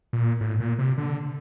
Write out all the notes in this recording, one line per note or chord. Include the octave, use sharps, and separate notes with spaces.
A#2
A2
A#2
C3
D3